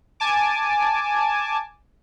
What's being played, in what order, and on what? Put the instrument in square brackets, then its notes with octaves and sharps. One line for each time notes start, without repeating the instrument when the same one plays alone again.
[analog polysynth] G#5 A5 D6